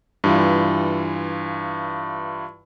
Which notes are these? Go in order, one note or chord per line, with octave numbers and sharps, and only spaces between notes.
G2 E3 F4